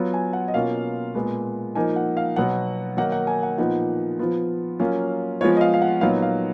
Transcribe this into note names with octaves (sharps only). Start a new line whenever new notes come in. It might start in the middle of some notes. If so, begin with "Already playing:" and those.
Already playing: F#3 B3 F4
G#5
F#5
D#5
B2 A#3 C#4 F4 F5
A#2 G#3 B3
F3 A#3 D#4 G#5
F#5
F5
B2 F#3 B3 F#5
D#3 F#3 A#3 D#4 F#5
F#5
G#5
F#5
A#2 F3 B3 D#4 F#5
F3 B3 F4
F#3 A#3 C#4 F4 F5
F3 G#3 B3 F4 C#5
D#5
F5
F5
F#5
A#2 F#3 B3 D#4 F5
F5